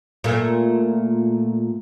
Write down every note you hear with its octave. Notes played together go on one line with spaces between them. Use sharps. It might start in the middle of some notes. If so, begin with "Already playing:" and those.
A#2 A3 A#3